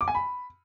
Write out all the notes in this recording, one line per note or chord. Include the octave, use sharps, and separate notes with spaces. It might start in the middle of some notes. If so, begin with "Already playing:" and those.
D6
G#5
B5